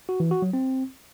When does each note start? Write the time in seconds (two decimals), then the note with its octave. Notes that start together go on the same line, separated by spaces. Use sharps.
0.09 F#4
0.20 E3
0.31 F#4
0.42 F#3
0.53 C4